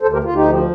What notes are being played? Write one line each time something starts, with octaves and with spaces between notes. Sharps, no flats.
D2 A4 C5
G4 A#4
D2 F4
D#4 G4
F3